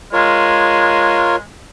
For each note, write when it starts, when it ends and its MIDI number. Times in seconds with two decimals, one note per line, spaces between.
0.13 1.44 56
0.13 1.36 65
0.13 1.36 70
0.13 1.36 73